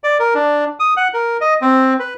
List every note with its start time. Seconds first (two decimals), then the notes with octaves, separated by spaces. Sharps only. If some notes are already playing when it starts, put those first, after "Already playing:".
0.04 D5
0.20 A#4
0.34 D4
0.80 D#6
0.97 F#5
1.14 A#4
1.41 D#5
1.61 C4
1.99 B4